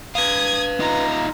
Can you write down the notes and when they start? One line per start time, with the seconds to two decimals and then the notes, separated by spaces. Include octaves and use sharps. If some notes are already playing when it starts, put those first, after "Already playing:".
0.15 B4 F5 D#6 G#6
0.80 D#4 F4 A#5